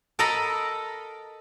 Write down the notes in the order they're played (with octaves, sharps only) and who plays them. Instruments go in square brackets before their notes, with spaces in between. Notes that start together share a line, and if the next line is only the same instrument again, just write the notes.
[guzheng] A4 A#4 D#5 A#5 B5